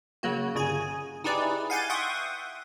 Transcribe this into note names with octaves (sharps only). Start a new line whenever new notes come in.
C#3 F#3 A#3 F#4
G1 C#3 G#4 G#5
D#4 E4 G4 G#4 B4 D5
F5 F#5 G#5 G6 A6 D#7
E5 F#5 G5 C6 C#6 D#6